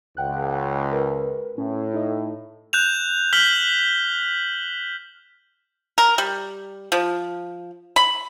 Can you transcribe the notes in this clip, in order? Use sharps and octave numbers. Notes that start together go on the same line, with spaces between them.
C#2 F#5 G5 F#6
A#4 B4
A2 C#4
D#4 A4 D#5
F#6 G6 E7 F7
F6 G6 B6 F#7 G7
A#4
G3
F3
B5